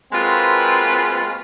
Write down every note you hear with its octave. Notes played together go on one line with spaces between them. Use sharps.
G#3 A#3 C4 F4 F#4 B4